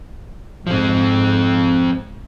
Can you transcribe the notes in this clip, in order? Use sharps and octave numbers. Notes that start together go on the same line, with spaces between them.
G#2 F3 C4